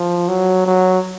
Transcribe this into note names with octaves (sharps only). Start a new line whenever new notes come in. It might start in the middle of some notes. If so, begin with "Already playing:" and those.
Already playing: F3
F#3
F#3